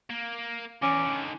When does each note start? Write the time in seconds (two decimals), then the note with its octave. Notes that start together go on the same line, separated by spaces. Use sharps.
0.10 A#3
0.83 E2 C#4 D6
1.04 D3 D#3